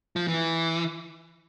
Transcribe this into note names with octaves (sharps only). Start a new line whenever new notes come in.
F3
E3